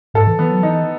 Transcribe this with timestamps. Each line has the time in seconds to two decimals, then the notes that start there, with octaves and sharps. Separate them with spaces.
0.14 G#2 A4
0.27 E3
0.39 E3 B3
0.51 F#3
0.62 E3 D#4